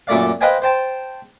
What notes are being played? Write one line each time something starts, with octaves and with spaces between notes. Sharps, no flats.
F#2 A#2 A3 D5 F5
B4 C5 D#5 F5 G5 G#5
C5 G5 A5